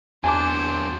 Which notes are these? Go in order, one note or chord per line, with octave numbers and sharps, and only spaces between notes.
E2 F#3 D4 C5 G#5 A5 D6